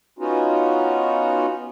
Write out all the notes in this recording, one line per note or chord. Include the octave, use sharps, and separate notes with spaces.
B3 C#4 D#4 F4 F#4